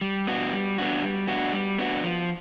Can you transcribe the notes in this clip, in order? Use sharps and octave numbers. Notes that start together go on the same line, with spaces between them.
G3
B3 D4 F#4
G3
B3 D4 F#4
G3
B3 D4 F#4
G3
B3 D4 F#4
F3